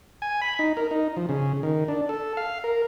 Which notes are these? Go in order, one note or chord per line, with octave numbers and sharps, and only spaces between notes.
G#5
B5
D#4
A#4
D#4
F3
C#3
D#3
D4
A4
F5
A#4